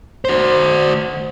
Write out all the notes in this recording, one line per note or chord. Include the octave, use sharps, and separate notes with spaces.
F#4 C5